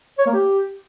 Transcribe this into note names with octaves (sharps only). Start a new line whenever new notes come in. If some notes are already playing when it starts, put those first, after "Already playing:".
C#5
A#3
G4